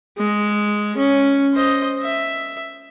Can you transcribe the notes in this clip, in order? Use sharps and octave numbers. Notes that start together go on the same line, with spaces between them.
G#3
C#4
C5 D#5
E5